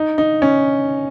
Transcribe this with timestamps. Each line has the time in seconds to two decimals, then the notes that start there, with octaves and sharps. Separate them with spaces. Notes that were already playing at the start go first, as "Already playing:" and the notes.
Already playing: D#4
0.18 D#4
0.42 C#4